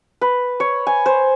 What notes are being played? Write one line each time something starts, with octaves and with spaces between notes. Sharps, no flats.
B4
C#5
G#5
C5